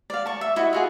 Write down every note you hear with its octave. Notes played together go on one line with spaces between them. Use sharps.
D5 F5
A5 C#6
E5
E4 F#4 D#5
F4 F#4 G#4